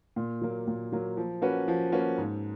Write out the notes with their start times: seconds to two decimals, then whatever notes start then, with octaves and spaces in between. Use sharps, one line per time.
0.16 A#2
0.41 F#3 A#3
0.67 A#2
0.92 F#3 A#3
1.17 F3
1.42 A#3 C#4 F#4 B4
1.68 F3
1.92 A#3 C#4 F#4 B4
2.18 G#2